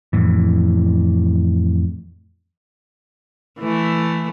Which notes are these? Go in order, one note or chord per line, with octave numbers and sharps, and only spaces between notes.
F2 A2 E3
E3 A3